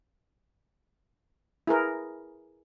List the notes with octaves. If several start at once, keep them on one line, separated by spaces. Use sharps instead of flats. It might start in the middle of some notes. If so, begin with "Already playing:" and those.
E4 G#4 A#4 B4